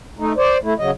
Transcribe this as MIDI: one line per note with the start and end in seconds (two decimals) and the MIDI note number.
0.19 0.33 57
0.19 0.33 63
0.37 0.58 72
0.37 0.58 74
0.63 0.74 57
0.63 0.74 64
0.79 0.91 49
0.79 0.91 54
0.79 0.91 75